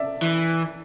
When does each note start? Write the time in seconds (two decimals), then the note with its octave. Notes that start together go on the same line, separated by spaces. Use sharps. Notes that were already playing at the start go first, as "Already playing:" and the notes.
Already playing: D5 E5
0.22 E3